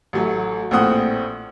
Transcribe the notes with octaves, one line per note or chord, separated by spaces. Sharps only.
A1 F#3 A3
A#1 A2 C4 F#5 D#6